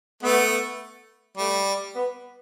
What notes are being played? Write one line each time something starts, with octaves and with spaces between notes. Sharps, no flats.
A3 B3
G3 A3
B3